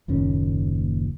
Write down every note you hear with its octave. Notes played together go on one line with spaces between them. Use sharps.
F#1 D#2 A#2 C#4